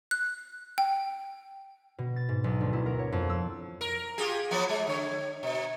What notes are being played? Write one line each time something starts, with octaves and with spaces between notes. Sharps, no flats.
F#6
G5
B2
A6
G#2
B1
D2
E4
A#4
C#5
F2
E6
A#4
F4 G4 G#4
F3 F#3 B3
G#3
D3 C#5
B2